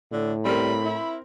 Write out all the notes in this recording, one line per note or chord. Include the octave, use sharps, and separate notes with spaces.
A2 D3
G3 C4 A#4 B5
E4